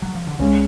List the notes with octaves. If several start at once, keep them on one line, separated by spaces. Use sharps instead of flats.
F#3
F3
D3
C#2 C#3 G#3 C#4